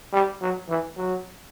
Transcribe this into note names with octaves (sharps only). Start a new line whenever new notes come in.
G3
F#3
E3
F#3